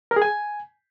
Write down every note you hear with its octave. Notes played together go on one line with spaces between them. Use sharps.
A#4
G#4
G#5